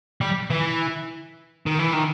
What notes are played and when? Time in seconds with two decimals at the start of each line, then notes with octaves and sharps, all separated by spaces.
0.21 G3
0.50 E3
1.66 D#3
1.79 E3
1.93 D#3